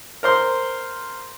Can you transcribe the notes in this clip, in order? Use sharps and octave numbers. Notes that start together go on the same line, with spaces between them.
A#4 C5 C6